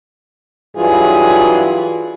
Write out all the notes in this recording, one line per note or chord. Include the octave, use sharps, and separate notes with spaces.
G2 E3 F#3 F4 G#4